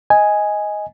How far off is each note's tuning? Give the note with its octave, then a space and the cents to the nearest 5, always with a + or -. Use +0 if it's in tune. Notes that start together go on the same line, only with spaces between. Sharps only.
D#5 +10 G#5 +0